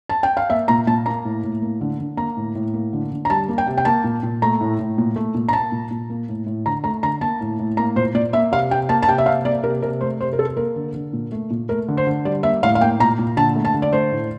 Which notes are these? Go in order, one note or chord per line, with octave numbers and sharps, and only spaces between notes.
A5
G5
F5
A#3 E5
A#2 A#5
A#2 A5
A#3 A#5
A2
A2
A#3
D3
D3
A#3 A#5
A2
A2
A#3
D3
D3
A#5
G3 A5
A#3
G5
C3
G5
A#3 A5
A#2
A#2
A3 A#5
A2
A2
A#2
A3
A#2
A#5
A#3 A5
A#2
A#2
A#3
A2
A2
D3 A#5
A3 A#5
D3 A#5
A#3 A5
A2
A2
A#3 A#5
A#2 C5
A#2 D5
A#3 E5
C3 F5
C3 G5
A#3 A5
A5
C3 G5
E5
C3 F5
A#3 D5
C3 A#4
C3 A#4
A3 C5
C3 C5
A#4
C3 A4
A#3 A#4
D3
D3
A#2
A3
A#2
A3 A#4
D3
C5
D3
G3 D5
A#3 E5
A2 F5
F5
A#3 G5
A#2 A#5
A#2
D3 A5
A3
A5
D3
D5
A3 C5
A2